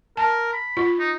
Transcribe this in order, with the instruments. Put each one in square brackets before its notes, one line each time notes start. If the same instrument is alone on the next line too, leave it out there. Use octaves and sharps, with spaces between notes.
[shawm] A#4 [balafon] A5
[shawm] B5
[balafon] F4
[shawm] D#4